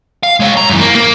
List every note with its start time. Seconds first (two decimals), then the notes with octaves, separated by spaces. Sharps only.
0.23 F5
0.40 G#3 C#5
0.57 A#5
0.70 F#2 E3
0.81 A#3
0.95 A#3